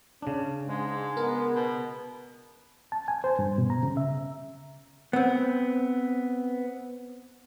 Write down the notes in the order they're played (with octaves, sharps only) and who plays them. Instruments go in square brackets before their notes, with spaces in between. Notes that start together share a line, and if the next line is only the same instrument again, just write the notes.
[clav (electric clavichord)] C#3 D4 [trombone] C#4
[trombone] G#2 [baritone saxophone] G#3
[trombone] B3 [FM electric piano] A#4
[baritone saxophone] B2
[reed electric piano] A5
G#5
C5
G2
B2
A#5
C#3
E5
[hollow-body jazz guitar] B3 C4